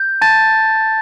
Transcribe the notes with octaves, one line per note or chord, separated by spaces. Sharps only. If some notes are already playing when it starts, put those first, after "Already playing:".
Already playing: G6
A5 A6